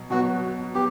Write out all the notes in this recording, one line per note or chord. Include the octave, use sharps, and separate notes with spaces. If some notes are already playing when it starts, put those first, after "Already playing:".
Already playing: B2 F#3
B2 F#3 B3 F#4
B3 G4